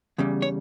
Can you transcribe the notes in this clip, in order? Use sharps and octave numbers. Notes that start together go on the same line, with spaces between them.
E2 C#3 G3
C#5